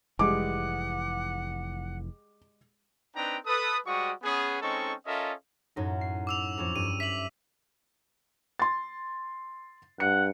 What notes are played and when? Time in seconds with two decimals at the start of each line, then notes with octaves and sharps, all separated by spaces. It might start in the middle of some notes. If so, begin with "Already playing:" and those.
0.19 F1 E3 G3 G#3 G#4 F#5 D6
3.16 C4 D4 D#4 B4 G5 A#5
3.46 A4 B4 D#6
3.86 G3 G#3 F#4 C5 C#6 D#6
4.23 B3 C#4 G#4
4.62 G#3 C4 C#4 D#4 A4 C#6
5.07 C#4 F4 A4 A#4 D#5 E5
5.76 F#2 A2 D#4
6.01 C7
6.27 D6 E6 F7
6.58 F2 C#4
6.76 G2 D#7
7.00 E5 B6 F#7
8.59 C6 A6
10.00 G2 F#5 C#7